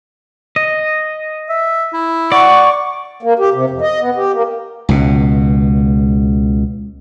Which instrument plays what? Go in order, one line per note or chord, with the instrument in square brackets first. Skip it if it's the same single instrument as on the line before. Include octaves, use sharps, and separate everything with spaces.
[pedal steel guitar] D#5
[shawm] E5
E4
[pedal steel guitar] D5 [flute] F#5 [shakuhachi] C#6
[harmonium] A#3
G4
C3
F2
D#5
B3
G4
A#3
[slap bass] C#2 B2